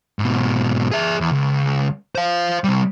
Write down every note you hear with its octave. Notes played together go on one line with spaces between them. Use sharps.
G#2 B2
G#4 E5
E2
C#2
C5 F5
C3 G3